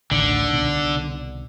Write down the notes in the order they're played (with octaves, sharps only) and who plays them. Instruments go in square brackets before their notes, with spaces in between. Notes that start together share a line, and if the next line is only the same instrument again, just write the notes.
[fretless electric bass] A1 D2 D#3 [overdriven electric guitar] D3
[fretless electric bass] C2 B2 D#3